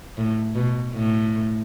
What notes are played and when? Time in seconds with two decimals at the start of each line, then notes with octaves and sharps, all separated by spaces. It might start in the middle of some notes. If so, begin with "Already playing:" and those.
0.17 A2
0.55 B2
0.93 A2